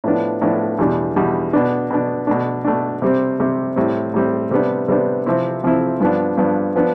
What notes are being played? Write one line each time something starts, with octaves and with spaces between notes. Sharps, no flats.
A2 F3 B3 D4
A2 F3 B3 D4
E2 B2 G3 D4
E2 B2 G3 D4
B2 B3 D4
B2 B3 D4
B2 A3 D4
B2 A3 D4
C3 G3 C4
C3 G3 C4
A2 G3 C4
A2 G3 C4
C3 G3 B3 D4
C3 G3 B3 D4
C3 F3 C4 E4
C3 F3 C4 E4
G2 F3 B3 D4
G2 F3 B3 D4
F3 B3 D4